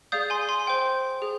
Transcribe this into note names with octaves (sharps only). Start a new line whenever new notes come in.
G#4 D5 F5 D#6 G6
G#5 C6
G#5 C6
C5 G5
G#4